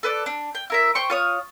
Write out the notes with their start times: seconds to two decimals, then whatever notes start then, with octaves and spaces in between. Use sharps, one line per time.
0.03 A4 B4 D5
0.26 D4
0.55 G5
0.70 E4 A#4 E5
0.95 C5 G5 C#6
1.10 F4 C#5 D#6